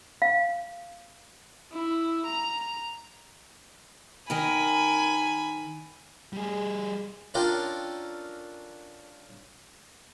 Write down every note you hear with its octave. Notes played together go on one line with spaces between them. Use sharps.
F5
E4
A#5
D#3 A#4 G#5 B5
G3 G#4
C#4 D4 F4 A4 A#4 G5